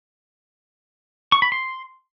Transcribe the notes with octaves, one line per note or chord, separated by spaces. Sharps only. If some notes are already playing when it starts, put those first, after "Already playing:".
C#6
B5
C6